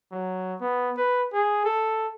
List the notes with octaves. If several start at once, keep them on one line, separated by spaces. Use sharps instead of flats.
F#3
B3
B4
G#4
A4